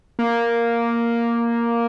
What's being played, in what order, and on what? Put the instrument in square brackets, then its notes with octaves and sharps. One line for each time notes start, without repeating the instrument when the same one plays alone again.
[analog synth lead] A#3